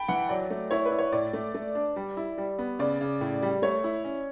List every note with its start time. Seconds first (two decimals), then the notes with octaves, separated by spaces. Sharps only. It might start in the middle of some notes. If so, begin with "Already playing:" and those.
Already playing: G5 A5 B5
0.08 E3 F#5
0.29 F#3 D5
0.50 A3
0.71 E4 C#5
0.86 B4
0.92 E4
0.99 C#5
1.12 A2 D5
1.33 A3
1.54 A3
1.75 D4
1.96 G3
2.17 E4
2.38 G3
2.59 B3
2.79 C#3 D5
3.01 C#3
3.21 A2
3.42 G3
3.62 A3 C#5
3.84 E4
4.04 C#4